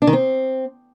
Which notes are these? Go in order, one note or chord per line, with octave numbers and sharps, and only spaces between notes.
D4
D#3
C4